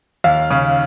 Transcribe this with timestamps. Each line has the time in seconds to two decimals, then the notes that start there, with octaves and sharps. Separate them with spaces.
0.24 D#2 F5
0.50 C#3